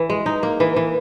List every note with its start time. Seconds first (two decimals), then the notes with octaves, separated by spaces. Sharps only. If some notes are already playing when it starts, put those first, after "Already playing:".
Already playing: E3
0.10 G#3
0.26 D#4
0.43 A#3
0.60 E3
0.76 E3